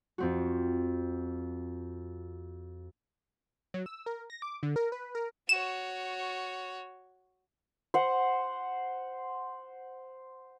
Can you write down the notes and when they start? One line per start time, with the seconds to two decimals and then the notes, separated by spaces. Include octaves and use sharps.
0.18 F2 C4 F#4
3.74 F#3
3.86 E6
4.06 A#4
4.30 A#6
4.42 D6
4.63 D3
4.76 A#4
4.92 B4
5.15 A#4
5.49 F#4 C#5 E7
7.94 C5 F#5